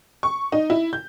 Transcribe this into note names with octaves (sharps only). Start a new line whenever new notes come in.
C#6
D#4
E4
G6